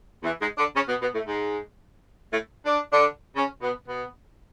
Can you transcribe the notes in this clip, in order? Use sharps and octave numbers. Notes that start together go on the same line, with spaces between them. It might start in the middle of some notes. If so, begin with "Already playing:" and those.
E2 E3
G#2 G#3
D3 D4
C#3 C#4
B2 B3
B2 B3
A2 A3
G#2 G#3
A2 A3
D4
D3 D4
C#3 C#4
B2 B3
B2 B3